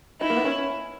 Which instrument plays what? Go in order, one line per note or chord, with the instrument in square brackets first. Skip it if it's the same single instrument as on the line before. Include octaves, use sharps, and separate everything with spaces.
[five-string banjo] D#4 [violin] E4
[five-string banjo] A#3
B3
C#4